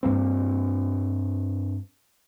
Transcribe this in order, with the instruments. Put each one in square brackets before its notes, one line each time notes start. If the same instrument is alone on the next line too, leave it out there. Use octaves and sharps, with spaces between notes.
[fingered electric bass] G2 A#3 C4